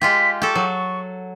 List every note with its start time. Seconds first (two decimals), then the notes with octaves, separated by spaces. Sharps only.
0.01 G#3 F4 G4 B6
0.42 G4 A4 C#6
0.55 F#3